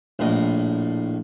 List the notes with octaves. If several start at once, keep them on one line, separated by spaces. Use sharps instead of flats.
A#1 A2 D#5